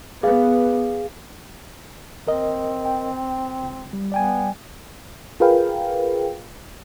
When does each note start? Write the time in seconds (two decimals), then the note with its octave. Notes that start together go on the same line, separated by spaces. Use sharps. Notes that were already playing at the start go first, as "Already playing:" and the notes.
0.23 B3 G#4 F5
2.27 D#2 C4 A#4 D#5
2.86 G5
3.63 C#2
3.93 G3
4.12 B3 D5 G5 G#5
5.40 F4 G#4 A#4 B4 F5 G5